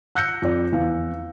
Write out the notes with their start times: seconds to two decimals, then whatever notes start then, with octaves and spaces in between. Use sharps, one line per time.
0.15 E6 F#6 G6 A#6 C#7
0.42 F2 D5
0.72 E2 F5